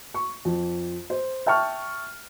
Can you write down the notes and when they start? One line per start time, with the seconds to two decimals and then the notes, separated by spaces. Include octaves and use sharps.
0.14 C#6
0.45 F2
1.10 C5
1.46 E5 G5 A5 C#6 F6